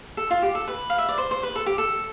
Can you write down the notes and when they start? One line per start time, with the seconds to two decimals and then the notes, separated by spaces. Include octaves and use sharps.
0.17 A4
0.31 F4
0.42 G4
0.55 A4
0.67 B4
0.90 F5
0.98 E5
1.09 D5
1.18 C5
1.31 C5
1.43 B4
1.55 A4
1.66 G4
1.78 A4